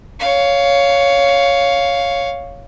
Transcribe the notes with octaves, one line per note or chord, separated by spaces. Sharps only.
C#5 F5